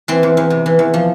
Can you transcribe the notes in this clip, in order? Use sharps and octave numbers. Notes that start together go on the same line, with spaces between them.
E3 C4
E2
E2
C3
E3
E2
F3